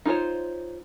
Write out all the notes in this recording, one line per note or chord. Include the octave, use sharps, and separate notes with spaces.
D#4 F4 G#4 C5 C#5